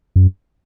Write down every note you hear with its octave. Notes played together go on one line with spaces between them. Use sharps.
F#2